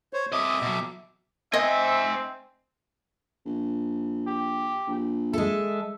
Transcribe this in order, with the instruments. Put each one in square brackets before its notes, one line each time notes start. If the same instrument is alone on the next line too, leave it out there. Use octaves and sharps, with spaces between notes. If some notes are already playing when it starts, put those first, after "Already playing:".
[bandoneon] C5 C#5
[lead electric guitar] C4 D#5 [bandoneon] E5 D6
[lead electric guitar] B2 F#3
[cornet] C4 [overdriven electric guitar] C5 G#5 [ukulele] D#5 [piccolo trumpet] E5
[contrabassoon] A#1
[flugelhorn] G4
[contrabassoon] A#1
[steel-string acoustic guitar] G#3 A4 [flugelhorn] E5